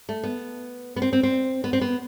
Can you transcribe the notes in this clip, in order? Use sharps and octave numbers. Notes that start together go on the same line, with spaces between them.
A3
B3
B3
C4
C4
C4
B3
C4
B3